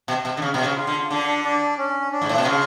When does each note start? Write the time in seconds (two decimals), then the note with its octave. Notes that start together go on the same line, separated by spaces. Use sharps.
0.08 B2
0.25 B2
0.37 D3
0.42 C#3
0.54 B2
0.65 C#3
0.76 F4
0.87 D3
1.10 D3 D4
1.44 D4
1.78 C#4
2.12 D4
2.22 G#2
2.29 A2
2.38 B2
2.45 C#3 F4